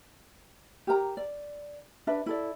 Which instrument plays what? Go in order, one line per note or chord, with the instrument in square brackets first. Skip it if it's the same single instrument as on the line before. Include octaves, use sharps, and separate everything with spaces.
[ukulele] G4 A#4 A#5
D5
D4 B4 E5
E4 A4 D5